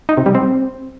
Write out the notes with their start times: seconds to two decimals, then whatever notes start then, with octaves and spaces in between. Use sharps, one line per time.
0.09 D#4
0.17 C3
0.26 G3
0.35 C4